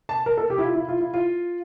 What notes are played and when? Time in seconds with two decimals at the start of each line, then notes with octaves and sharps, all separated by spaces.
0.09 A5
0.26 A#4
0.38 A4
0.50 G4
0.58 E4
0.64 F4
0.75 E4
0.88 F4
1.00 E4
1.14 F4